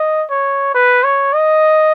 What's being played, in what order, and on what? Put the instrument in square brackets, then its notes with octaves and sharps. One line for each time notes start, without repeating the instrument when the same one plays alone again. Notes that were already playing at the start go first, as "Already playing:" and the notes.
Already playing: [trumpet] D#5
C#5
B4
C#5
D#5